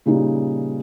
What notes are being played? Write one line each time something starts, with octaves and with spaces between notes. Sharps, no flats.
A#2 C#3 G3 D#4